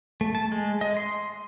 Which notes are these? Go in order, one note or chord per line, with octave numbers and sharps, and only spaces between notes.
A3
A5
G#3
D#5
C6